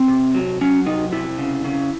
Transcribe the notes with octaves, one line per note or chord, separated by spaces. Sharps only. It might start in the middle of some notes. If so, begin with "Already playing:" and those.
Already playing: C4
C3
F#3
F#3 C#4
C3 D#4
C3 E4
C#3
C#3